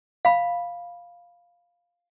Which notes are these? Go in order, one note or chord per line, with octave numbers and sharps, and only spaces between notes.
F5 B5